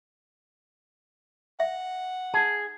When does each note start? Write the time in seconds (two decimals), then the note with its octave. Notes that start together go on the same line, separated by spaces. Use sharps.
1.60 E5 F#5
2.34 D#4 G#4 A5